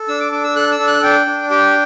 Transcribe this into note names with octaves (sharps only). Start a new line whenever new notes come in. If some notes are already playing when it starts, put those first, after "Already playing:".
Already playing: A4
D4 E6
D6
D4 D6
E6
A4 F#6
E6
D4
F#6
D4 G5
D4
G4 G5